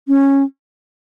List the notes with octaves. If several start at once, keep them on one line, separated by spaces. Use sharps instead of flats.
C#4